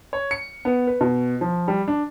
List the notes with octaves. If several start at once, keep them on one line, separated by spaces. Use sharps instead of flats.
C#5
C#7
B3
B4
B2
F3
G3
D4